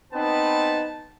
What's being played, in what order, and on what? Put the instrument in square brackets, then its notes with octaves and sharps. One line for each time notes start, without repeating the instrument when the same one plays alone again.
[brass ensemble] B3 C4 D#4 B4 A5